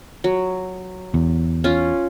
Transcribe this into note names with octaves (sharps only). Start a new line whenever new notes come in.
F#3
E2
C#4 F4